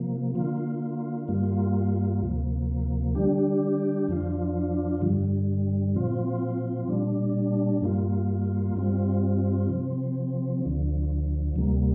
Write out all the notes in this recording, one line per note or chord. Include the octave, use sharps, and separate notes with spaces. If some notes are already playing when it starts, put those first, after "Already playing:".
Already playing: C3 F3 A#3
D3 A#3 F4
G2 G3 A#3 F4
D2 C3 F3 A#3
D3 G3 D4 G4
F2 F3 D4 F4
G2 D3 G3
A#2 F3 C4 F4
A#2 G3 D4
G2 G3 A#3 F4
G2 G3 C4 F4
C3 F3 C4
D2 D3 F3
D2 C3 G3 A#3